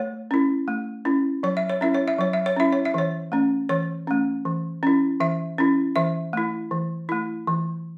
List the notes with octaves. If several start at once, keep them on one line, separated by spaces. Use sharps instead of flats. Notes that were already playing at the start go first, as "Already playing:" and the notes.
Already playing: A3 C#5
C#4 E4
A3
C#4 E4
F#3 C#5
E5
C#5
C#4 E4 E5
C#5
E5
F#3 C#5
E5
C#5
C#4 E4 E5
C#5
E5
E3 C#5
A3 C#4
E3 C#5
A3 C#4
E3
C#4 E4
E3 E5
C#4 E4
E3 E5
A3 E4
E3
A3 E4
E3